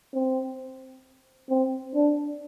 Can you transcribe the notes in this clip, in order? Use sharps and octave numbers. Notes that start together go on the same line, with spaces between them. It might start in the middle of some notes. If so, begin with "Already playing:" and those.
C4
C4
D4